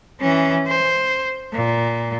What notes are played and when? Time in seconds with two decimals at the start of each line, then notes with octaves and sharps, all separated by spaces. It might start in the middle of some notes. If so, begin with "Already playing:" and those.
0.21 E3 C#4
0.67 C5
1.53 A#2